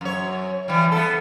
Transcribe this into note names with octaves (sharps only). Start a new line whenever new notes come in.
F#2 C#5
E3 G3
B3 A4